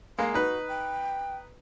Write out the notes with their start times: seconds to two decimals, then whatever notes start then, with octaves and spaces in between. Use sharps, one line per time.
0.19 G#3 A#3 F5
0.34 D#4 F#4 B4
0.68 G5